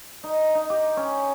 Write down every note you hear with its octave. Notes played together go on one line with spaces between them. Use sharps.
D#4
D#4
G4
C#4